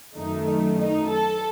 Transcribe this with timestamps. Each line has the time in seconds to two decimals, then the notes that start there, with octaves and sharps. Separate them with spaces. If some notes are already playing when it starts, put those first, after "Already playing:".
0.15 F#2 D#3 A3 D#4
0.78 D#4
1.09 A4